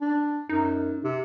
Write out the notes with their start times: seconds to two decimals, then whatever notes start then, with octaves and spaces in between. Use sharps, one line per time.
0.01 D4
0.49 F#2 D#4
1.04 C3